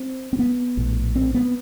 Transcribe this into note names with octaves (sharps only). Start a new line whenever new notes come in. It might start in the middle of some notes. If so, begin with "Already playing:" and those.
Already playing: C4
C4
B3
A#1 A2
C4
B3